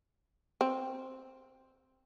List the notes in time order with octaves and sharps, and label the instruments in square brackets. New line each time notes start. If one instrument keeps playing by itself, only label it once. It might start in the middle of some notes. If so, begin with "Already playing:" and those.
[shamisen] C4